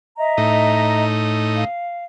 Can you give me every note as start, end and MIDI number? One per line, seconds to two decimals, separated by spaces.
0.17 1.04 75
0.17 1.04 76
0.17 1.04 82
0.37 1.64 45
0.37 1.64 63
1.55 2.03 77